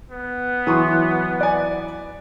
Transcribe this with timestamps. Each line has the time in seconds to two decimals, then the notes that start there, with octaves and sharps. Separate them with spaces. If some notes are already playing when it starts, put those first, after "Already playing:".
0.10 B3
0.67 E3 F#3 E4 C6 C#6 D#6
1.41 D5 G#5